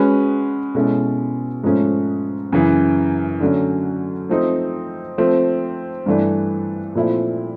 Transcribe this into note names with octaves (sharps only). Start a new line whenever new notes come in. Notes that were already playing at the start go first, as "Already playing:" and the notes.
Already playing: G#3 C#4 F#4 B4
B2 G#3 C#4 E4 A4
G#2 F3 A3 C#4
F#2 C#3 E3
D3 F#3 A3 C#4
F3 A3 C4 D#4
F3 A3 C4
G2 E3 A3 D4
A#2 F3 A3 C4 E4